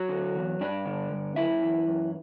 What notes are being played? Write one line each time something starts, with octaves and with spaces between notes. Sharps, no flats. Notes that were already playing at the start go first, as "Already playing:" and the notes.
Already playing: F#3 F#4
D3
E2
G2 D4 D5
D3
G2
F#2 E4 E5
E3
F#2